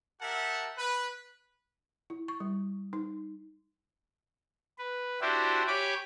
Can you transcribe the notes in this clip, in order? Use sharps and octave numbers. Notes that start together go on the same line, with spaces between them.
G4 A#4 E5 F#5 A5
B4
E4
C#6
G3
D#4
B4
D4 E4 F#4 G4 C5
G4 C#5 G#5 B5 D6